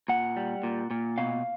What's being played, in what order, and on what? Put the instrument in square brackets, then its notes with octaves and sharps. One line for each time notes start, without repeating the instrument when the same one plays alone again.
[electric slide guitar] A#2 F#5
G3
A#2
A#2
B2 F5